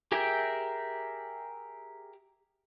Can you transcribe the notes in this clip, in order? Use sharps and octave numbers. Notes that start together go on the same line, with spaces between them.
G4 G#4 A#4 E5 G5